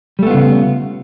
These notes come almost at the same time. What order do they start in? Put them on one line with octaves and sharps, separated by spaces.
G3 A3 B3 F4 C#3